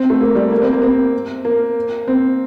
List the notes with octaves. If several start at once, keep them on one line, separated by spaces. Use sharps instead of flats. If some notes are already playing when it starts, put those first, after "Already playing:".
Already playing: C4
A3
A#3
G3
A#3
C4
A#3
C4
A#3
C4